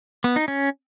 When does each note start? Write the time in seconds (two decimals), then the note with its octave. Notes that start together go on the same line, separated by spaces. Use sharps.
0.24 B3
0.36 D#4
0.48 C#4